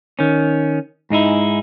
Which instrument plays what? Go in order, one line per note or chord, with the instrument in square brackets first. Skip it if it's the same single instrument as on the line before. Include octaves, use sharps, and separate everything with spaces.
[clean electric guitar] D#3 C#4
G#2 G#3 D#4 E4